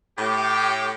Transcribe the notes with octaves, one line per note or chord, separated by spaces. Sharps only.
A2 G4 G5 D6